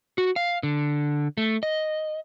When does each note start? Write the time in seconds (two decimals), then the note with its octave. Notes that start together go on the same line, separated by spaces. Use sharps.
0.18 F#4
0.36 F5
0.63 D3
1.38 A3
1.63 D#5